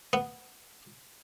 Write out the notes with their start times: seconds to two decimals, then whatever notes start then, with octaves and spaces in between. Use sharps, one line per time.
0.13 B3